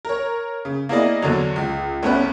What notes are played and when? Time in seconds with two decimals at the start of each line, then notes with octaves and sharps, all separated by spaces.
0.05 A#4 C#5
0.65 C#3
0.89 A#3 B3 E4 G#4 D5 D#5
1.22 E2 D3 F#3
1.56 C#2
2.03 C2 A3 B3 C#4 B4